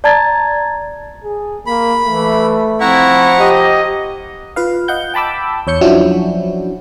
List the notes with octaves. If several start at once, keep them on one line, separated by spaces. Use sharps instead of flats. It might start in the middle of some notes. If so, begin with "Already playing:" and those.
D5 A5 A#5 G#6 A6
G#4
A#3 B5
E3 A3
F3 C4 E4 F#5 A#5 C#6
G4 D#5
F4 B4 F5
D#5 F5 F#5 G6
G5 A5 B5 D6 E6
E2 C#5 G6 C#7
F3 F#3 C#4 D4 E4 F#4